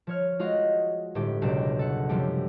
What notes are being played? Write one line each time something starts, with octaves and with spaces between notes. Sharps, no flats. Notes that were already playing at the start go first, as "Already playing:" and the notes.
F3 C#5 F6
G#3 F4 F#4 D#5 F5 F#5
G1 A2 G4
F#1 C#2 B2 D4 G5 E7
A4 F#5
F#2 C3 F3 G3 A3 G4